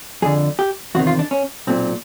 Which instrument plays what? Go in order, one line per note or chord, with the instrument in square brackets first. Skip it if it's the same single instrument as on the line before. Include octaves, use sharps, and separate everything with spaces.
[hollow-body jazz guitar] F2 D3 G#4
G4
E2 C3 D#3 F#4
F4
D4
C#4
B1 A#2 C4